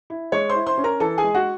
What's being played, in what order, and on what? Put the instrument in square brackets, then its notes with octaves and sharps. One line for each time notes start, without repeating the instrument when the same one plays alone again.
[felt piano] E4
G#3 C#5 C#6
C5 C6
E4
C5 C6
C#4
A#4 A#5
E3 A4 A5
G#4 G#5
G#3
F#4 F#5